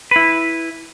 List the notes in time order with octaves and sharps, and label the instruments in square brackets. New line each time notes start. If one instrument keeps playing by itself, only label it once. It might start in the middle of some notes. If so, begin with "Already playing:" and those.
[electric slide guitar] E4 B4